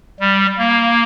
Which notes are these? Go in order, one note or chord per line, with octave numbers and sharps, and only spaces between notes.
G3
A#3